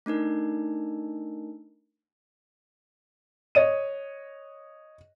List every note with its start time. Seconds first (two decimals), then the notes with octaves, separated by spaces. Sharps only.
0.06 A3 D4 D#4 A#4
3.55 C#5 D#5 D#7